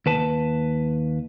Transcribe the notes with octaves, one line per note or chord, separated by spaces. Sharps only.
D#2 B4 A5